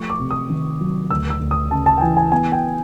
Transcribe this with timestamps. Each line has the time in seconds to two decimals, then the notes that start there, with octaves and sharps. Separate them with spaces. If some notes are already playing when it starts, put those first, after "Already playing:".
Already playing: F3 A3 C#6
0.10 D6
0.20 C3
0.31 D#6
0.50 D#3
0.81 F#3
1.10 D2 E6
1.30 E6
1.40 D2
1.51 D#6
1.71 C#3 A5
1.86 A5
1.97 G5
2.01 E3 G#5
2.17 G#5
2.32 B3 G#5
2.52 G5